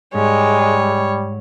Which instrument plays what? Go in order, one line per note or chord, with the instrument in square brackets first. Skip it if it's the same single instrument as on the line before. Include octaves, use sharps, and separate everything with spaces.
[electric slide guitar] G#2 [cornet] G3 [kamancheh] G#3 [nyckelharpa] C#5